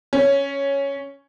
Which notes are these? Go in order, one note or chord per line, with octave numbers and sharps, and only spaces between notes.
C#4